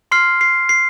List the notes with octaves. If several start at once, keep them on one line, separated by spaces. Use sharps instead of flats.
C6 F6 C7
C7
C7